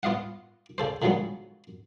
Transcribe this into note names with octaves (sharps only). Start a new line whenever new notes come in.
B3 F4 D#5 F5 F#5
C#3 A4 C5
D3 D#3 F3 F#3 G#3 B3